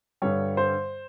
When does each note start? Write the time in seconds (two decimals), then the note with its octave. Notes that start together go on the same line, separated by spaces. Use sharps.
0.22 G2 D3 G3 C#5
0.57 C5